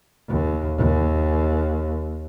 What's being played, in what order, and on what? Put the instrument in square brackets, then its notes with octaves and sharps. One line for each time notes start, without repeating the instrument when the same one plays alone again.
[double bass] D#2
D#2